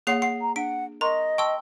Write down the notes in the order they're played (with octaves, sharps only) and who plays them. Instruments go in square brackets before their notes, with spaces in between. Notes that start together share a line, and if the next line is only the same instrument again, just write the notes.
[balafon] A#3 C#5 F#5 [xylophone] G#4 C7
[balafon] F#5 [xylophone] C7
[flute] A#5
[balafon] D4 [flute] F#5 [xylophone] D7
[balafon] A#4 C6 C#6 [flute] D#5 [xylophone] A#5
[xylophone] G5 C6 E6 [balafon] A5 C#6